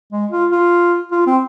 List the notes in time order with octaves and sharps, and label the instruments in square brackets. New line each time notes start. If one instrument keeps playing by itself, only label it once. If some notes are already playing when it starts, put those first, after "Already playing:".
[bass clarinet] G#3
F4
F4
F4
C4